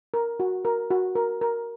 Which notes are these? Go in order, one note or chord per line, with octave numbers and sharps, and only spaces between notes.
A#4
F#4
A#4
F#4
A#4
A#4